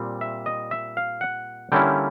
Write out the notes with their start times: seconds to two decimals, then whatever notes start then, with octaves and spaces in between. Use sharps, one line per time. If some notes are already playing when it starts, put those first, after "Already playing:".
Already playing: A#2 G3 C4
0.21 E5
0.46 D#5
0.71 E5
0.97 F5
1.21 F#5
1.72 D3 G3 A#3 C#4 E4 G5